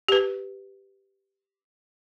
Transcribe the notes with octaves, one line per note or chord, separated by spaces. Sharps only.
G4 B4